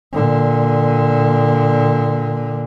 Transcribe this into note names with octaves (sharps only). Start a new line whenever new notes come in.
A#2 D3